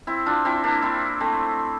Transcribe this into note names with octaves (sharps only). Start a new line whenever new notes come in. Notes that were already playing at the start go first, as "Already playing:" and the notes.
C4 E4
D4 F4
C4 E4
A#3 D4
C4 E4
A3 C4